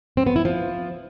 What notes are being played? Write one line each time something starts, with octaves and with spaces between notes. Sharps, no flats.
C4
B3
E4
F3